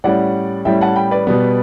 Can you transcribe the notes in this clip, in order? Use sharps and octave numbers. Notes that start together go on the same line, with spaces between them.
A2 G3 C#4 D5 F#5
A2 G3 C#4 E5 G5
F#5 A5
G5 B5
B4 D5
B2 G3 B3